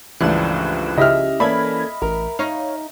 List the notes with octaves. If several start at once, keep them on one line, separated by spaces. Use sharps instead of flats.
C#2 G2 E3 F3 A3 D4 F#6 E7
C#3 E4 G4 D#5 E5 F6
E3 A#3 C#4 A4 D5 B5 G#6
A1 A#4
D#4 C#5 F5